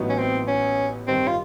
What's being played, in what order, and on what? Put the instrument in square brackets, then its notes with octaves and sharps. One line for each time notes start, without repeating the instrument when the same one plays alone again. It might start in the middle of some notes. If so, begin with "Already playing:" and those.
Already playing: [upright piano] A1 A2 F#3 B3 D#4
[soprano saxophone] C#4
C4
C#4
[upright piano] G2 D#3 G3 [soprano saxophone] C4
[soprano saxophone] F4